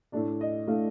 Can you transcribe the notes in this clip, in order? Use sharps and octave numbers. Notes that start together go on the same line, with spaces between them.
A2 A3 D4 D5
D#5
A2 A3 D4 F5